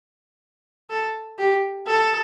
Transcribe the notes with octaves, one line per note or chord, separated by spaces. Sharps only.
A4
G4
A4